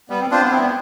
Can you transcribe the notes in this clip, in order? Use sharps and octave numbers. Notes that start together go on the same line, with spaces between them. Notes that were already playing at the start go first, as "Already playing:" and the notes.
G3 B3
C4
C4 D4 F4 C5
B3
C4 E4
B3